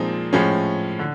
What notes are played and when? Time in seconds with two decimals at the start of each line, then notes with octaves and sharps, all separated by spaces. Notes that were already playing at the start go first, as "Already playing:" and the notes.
Already playing: A#2 F3 G#3 C4 D#4
0.33 A2 F3 G#3 C#4
0.99 D3